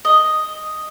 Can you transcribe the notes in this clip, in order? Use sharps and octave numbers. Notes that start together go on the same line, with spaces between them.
D#5